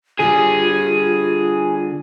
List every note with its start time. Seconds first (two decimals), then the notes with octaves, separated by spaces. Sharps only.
0.20 D3 G3 F4 G#4